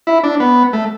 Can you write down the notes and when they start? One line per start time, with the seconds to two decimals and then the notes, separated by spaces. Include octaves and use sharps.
0.07 E4
0.24 D4
0.40 B3
0.73 A3